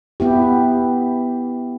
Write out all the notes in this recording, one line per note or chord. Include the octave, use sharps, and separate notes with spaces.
B3 E4 G4